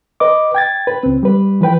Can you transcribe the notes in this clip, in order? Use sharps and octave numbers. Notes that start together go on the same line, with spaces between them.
B4 D#5 D6
G5 G#6 A6
B4
C#2 C4
G3 B4
E3 F3 B4 G5